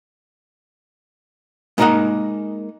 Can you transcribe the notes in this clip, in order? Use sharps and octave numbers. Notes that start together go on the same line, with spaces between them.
G#3 A#3 D#4 A#4 D#5 F#5